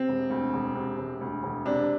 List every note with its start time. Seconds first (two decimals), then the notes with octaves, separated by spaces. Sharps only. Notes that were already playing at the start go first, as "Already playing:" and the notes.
Already playing: C3 C4
0.08 E1
0.30 D2
0.53 E1
0.75 C3
0.98 E1
1.21 D2
1.43 E1
1.66 C3 D4